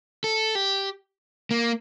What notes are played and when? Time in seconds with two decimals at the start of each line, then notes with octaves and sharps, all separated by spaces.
0.24 A4
0.55 G4
1.51 A#3